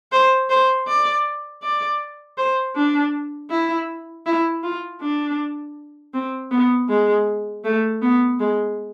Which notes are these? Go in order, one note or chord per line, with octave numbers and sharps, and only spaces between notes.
C5
C5
D5
D5
C5
D4
E4
E4
F4
D4
C4
B3
G#3
A3
B3
G#3